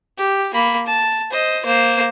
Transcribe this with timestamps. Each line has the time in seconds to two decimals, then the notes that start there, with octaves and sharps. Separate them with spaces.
0.18 G4
0.53 A#3 B5
0.87 A5
1.31 C5 D#5
1.66 A#3 C5